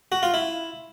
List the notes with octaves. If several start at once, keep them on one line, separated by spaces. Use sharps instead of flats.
F#4
F4
E4